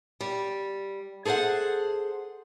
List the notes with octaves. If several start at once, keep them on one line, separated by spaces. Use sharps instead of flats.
G3
G#4 A4 C5 F5 F#5